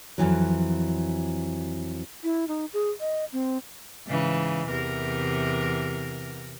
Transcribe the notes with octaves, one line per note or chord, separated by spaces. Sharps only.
F2 G#2 E3 F#3
E4
D#4
G#4
D#5
C4
G#2 C#3 E3
E2 C3 A#4